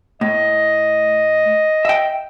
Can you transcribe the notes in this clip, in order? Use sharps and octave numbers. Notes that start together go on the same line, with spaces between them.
A2 D#5
E5 G5